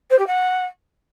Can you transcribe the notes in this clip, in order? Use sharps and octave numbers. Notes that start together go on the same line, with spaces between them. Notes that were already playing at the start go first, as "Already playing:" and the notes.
C5
G4
F#5